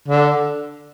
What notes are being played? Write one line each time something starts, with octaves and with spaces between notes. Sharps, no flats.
D3